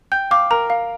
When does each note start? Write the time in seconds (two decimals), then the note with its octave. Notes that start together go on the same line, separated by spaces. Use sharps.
0.12 G5 G6
0.31 F5 D6
0.51 A#4 A#5
0.70 F5